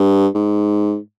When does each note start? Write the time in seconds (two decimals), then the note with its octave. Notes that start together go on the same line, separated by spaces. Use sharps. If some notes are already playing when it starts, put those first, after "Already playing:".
Already playing: G2
0.34 G#2